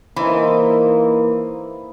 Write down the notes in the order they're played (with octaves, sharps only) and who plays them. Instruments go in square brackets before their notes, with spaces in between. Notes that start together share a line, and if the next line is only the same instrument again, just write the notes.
[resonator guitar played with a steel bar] E3 [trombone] A#3 [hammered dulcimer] D#4 E4 C5